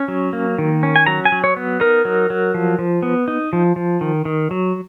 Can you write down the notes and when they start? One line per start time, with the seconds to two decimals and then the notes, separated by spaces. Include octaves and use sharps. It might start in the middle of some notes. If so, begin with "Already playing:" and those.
Already playing: C#4
0.08 F#3
0.33 A#3
0.58 D#3
0.83 C#4
0.96 G#5
1.07 F#3 A#5
1.25 G#5
1.32 F#3
1.44 C#5
1.57 B3
1.80 D#4 A#4
2.05 F#3
2.30 F#3
2.54 F3
2.79 F3
3.03 B3
3.28 D#4
3.53 F3
3.76 F3
4.01 D#3
4.25 D#3
4.51 F#3